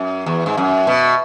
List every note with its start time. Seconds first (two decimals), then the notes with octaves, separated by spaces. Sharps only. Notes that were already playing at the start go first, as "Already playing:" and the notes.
Already playing: F#2
0.26 E2
0.46 G#2
0.57 F#2
0.87 B2